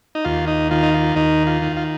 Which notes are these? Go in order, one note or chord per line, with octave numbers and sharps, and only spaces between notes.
D#4
D#2 F4
D#4
D#3 F4
D#4
F4
D#2 D#4
F4
D#3
F4